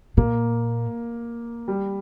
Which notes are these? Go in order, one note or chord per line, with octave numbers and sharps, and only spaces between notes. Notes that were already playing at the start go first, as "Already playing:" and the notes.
A#2 A#3
G3